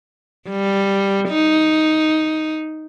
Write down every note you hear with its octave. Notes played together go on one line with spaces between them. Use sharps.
G3
D#4